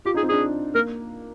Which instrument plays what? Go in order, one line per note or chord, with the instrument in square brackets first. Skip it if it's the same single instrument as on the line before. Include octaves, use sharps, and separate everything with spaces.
[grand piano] F4 [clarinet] G4
[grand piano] D#4 [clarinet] G#4
[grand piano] C4
[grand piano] D4 [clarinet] G#4
[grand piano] A#3 [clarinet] A#4